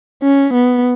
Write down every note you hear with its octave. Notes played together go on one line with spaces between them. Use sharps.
C#4
B3